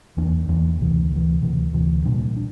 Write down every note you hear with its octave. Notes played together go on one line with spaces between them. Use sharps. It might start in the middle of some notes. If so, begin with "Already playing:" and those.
E2 E3 A#3 D4
E2 E3 A#3 D4
D2 C3 E3
D2 C3 E3
D2 C3 E3
D2 C3 E3
A#2 G3 A#3 D4
D4